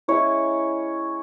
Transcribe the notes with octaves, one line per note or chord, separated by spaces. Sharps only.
G#3 C#4 E4 C#5